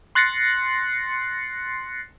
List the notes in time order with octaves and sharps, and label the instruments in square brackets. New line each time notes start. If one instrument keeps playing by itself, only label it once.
[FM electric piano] C6 F#6 A6 A#6 C7 C#7